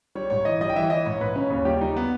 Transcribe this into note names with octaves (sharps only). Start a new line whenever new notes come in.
G3 C#5
G#2 C#5
E3 D#5
G3 D#5
G5
E3 E5
E3 D#5
G#2 C#5
G#2 B4
C#3 C#4
D#2 C#4
G3 G4
G3 D#4
B3